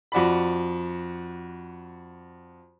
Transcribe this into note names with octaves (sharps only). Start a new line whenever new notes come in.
F2 F#4 D5 B5